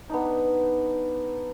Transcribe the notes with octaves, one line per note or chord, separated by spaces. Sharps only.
B3 D4 D#4